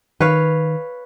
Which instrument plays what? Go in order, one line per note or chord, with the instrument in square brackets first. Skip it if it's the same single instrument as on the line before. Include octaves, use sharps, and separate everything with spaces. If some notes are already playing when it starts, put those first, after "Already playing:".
[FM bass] D#3 [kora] B4 C#5 F5